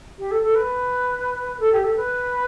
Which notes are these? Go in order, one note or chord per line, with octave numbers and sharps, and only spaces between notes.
G4
A4
A4
B4
A4
G4
A4
B4